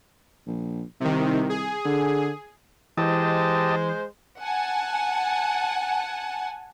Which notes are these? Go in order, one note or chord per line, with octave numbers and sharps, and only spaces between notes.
A#1
C2 C3 D#3
G#4
D3
E3 G#3 G4 C5 D#5 A5
F#5 G#5 A5